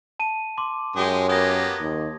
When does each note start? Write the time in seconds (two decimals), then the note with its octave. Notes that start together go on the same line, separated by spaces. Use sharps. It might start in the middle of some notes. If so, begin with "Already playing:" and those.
0.19 A5 D#7
0.58 C6 D6
0.96 F#2 G#3 G4 G#4
1.29 A#3 B3 G4 D#6 G#6 A#6
1.80 D#2